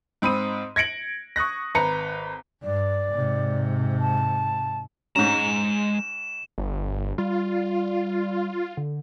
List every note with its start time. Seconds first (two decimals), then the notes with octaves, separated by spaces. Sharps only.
0.22 G#2 C4 B5 D#6 D#7
0.76 G#6 A#6 C#7 D7 F#7
1.36 C#6 D#6 F#6 A#6
1.75 G#1 B4 A#5 C#7
2.63 G2 D5
3.13 G#2 C3
4.00 A5
5.16 G#2 G#3 C#4 A#5 E7
6.58 G1
7.18 G3 F4
8.77 D3